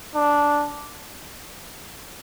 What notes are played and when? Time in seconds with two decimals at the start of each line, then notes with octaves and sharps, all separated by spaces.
0.16 D4